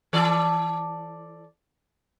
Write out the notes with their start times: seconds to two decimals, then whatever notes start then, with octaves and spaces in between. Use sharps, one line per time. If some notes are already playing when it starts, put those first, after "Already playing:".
0.13 E3 A4 D5